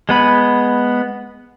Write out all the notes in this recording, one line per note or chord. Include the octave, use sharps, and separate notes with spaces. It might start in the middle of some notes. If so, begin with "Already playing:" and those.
G#3 B3 B5